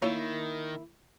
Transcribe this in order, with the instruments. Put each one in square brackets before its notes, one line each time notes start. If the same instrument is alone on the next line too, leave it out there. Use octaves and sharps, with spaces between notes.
[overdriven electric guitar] D#3 [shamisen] A3 F4 C#5 [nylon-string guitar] A#3 E4